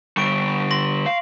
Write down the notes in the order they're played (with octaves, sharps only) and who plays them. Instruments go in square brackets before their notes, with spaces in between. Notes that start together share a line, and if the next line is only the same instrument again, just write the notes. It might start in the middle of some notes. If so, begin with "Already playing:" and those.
[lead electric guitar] D3 G3 [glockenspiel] C#6 D7
[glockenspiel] C6 A#6 F#7
[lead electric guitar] F5